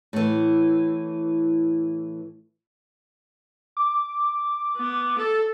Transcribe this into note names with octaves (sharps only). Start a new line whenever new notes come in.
A2 E3
D6
B3
A4